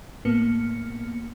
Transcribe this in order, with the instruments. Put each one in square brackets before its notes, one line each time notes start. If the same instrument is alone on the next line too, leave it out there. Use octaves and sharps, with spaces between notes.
[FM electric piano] A2 A#3 B3 F6 C#7